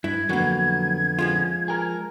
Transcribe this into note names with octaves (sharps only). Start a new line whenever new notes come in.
G2 E4 G#6
F2 D3 F#3 A#3 B3
F3 G#3 F4
G#4 A#4